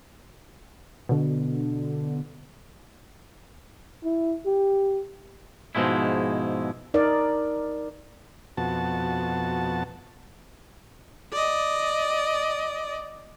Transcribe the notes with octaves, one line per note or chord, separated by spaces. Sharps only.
B2 D3
E4
G4
G#2 B2 F3 G#3 E4
D#4 A#4 D5
F2 B2 F#4 A5
D5 D#5